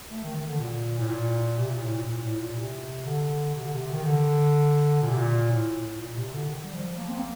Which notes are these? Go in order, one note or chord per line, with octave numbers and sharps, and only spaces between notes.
A3
D#3
D#3
D3
A#2
A2
A#2
C3
A#2
A2
A#2
A#2
A2
A#2
C3
D3
C3
D3
C3
D#3
D3
A#2
C3
A#2
A2
A#2
C3
D3
D#3
G3
F3
A#3
C4
A#3